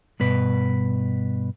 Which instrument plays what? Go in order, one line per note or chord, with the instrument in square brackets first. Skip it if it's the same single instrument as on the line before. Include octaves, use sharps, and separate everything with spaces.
[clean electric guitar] G2 B2 B4